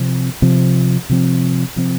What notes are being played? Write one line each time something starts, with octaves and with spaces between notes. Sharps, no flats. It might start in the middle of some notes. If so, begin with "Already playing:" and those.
Already playing: C3 F3 C4
C3 F3 C4
C3 F3 C4
C3 F3 C4